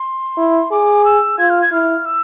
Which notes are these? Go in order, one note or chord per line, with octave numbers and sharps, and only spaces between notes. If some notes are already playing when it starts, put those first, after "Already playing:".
Already playing: C6
E4
G#4 D6
E6
F4 G#6
F6
G#6
E4 F6
E6